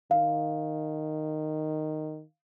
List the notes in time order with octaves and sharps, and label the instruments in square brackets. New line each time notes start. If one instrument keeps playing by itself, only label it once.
[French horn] D#3 [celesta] F5